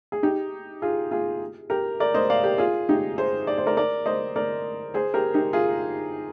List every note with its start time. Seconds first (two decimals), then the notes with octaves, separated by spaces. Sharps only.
0.12 G#4
0.23 D#4 G4
0.82 F4 G#4
1.11 F4 G#4
1.70 G4 A#4
2.00 A#4 D5
2.14 C5 D#5
2.30 D5 F5
2.43 G4 A#4
2.58 F4 G#4
2.89 D#4 G4
3.18 G#4 C5
3.47 D5
3.57 C5
3.67 A#4 D5
3.77 A#4 D5
4.06 C5 D#5
4.36 A#4 D5
4.94 G#4 C5
5.14 G4 A#4
5.34 D#4 G4
5.53 F4 G#4